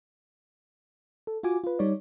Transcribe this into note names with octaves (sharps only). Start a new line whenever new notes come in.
A4
F4 F#4 G#5 D6
F4 B4
G3 D#4 C#5 D5